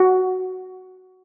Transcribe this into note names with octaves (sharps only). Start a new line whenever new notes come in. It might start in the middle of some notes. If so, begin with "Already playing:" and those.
Already playing: F#4